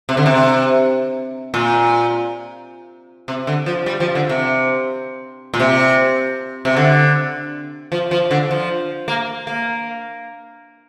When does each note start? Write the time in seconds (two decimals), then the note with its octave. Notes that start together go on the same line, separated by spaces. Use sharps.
0.09 C3
0.17 D3
0.26 C3
1.54 A#2
3.28 C3
3.47 D3
3.66 F3
3.86 G3
4.00 F3
4.15 D3
4.29 C3
5.54 A#2
5.60 C3
6.65 C3
6.76 D3
7.92 F3
8.11 F3
8.31 D3
8.51 F3
9.08 A#3
9.47 A#3